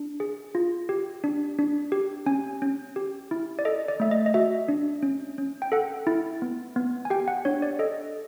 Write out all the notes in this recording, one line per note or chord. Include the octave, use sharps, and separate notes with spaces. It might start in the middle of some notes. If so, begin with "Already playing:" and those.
Already playing: D4
G#4
F4
G4
D4
D4
G4
C#4 G#5
C#4
G4
E4
D5
A4 D#5
D5
A3 E5
D#5
D#5
F#4 E5
D4
C#4
C#4
G5
A4 F#5
E4
B3
B3
G#5
G4 G5
F#5
D4 C#5
D5
A4 D#5